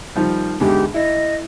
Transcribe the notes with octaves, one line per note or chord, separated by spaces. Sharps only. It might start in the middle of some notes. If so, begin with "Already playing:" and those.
D#3 F3 G3
E2 G#2 D3 G4
E4 D#5